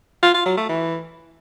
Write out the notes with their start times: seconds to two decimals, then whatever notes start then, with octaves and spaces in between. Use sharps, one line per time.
0.23 F4
0.34 F4
0.46 F#3
0.57 A3
0.69 E3